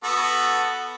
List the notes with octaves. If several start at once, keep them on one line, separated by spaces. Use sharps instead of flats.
B3 F#4 A4